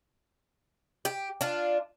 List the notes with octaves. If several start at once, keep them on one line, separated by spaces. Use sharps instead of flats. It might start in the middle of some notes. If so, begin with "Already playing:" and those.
G4
D4 F4